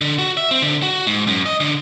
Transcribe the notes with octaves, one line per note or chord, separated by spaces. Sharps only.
D3
F#4
E5
C4
D3
F#4
G#2
F#2
D#5
D3